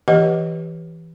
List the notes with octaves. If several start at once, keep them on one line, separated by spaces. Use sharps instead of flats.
E3 G4 B4 D#5 F#5